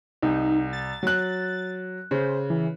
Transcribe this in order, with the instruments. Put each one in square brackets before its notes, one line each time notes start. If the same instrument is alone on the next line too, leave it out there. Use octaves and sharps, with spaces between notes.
[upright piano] C2 [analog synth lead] D#4
[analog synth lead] A6
[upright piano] F#3 F#6
[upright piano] C#3 [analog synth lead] C5
[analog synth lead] E3